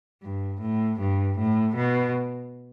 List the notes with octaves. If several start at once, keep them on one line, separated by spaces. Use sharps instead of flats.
G2
A2
G2
A2
B2